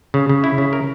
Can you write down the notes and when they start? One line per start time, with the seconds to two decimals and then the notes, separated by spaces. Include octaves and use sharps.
0.14 C#3
0.29 C#3
0.44 E4
0.58 C#3
0.73 A#4